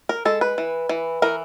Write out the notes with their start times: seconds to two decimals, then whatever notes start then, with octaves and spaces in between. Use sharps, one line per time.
0.09 A#4
0.25 G#3 A4
0.41 B4
0.58 E3
0.89 E3
1.22 E3 A#4